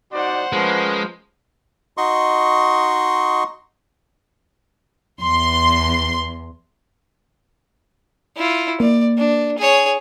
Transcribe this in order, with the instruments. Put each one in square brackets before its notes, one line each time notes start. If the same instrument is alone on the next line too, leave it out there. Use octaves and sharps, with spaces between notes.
[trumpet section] D#4 F#4 D5 [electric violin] C5 F#5
[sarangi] F3 [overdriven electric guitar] G#3 [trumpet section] C#4 A#4 B4
[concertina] D#4 F#4 D#5 C6 C#6
[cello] E2 [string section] C6
[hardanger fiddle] E4 F4
[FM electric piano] A#3 [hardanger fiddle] D5
[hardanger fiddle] D4
G#4 C#5